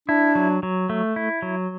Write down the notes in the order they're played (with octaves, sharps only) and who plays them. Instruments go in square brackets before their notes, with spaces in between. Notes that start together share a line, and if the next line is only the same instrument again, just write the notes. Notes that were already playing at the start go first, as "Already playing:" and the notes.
[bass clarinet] D4 [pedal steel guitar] E4
[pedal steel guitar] F#3
F#3
A3
E4
F#3